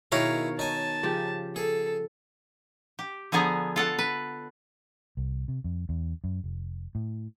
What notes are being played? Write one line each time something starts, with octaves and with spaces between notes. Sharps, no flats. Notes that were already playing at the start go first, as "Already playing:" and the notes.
B2 D#3 E4 G#4 A#4 C#5 F5
D#4 G#5 A5
C#3 F3 G4
G#4 A4
G4
D3 F3 B3 G#4 A#5
F4 A4 F#5
B4
C2
C3
F2
E2
F#2
F1
A2